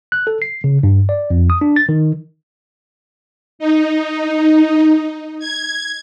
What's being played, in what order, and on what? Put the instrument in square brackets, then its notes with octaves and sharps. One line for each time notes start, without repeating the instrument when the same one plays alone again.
[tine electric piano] F#6
A4
C7
C#3
G2
D5
F2
D#6
D4
A6
D#3
[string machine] D#4
G#6